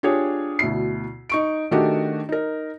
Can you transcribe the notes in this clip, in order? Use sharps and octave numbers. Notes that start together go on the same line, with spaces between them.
D4 F4 G4 G#4 C#5
D2 B2 E4 C7
D#4 C#6 D7
D#3 A3 D4 D#4 F#4 G4
D#4 A#4